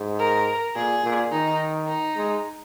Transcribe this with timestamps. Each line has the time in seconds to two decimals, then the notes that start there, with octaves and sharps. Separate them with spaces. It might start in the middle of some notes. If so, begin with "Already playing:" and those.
Already playing: G#2
0.19 A#4
0.75 A#2 G#4
1.03 A#2
1.32 D#3 D#4
1.88 D#4
2.16 G#3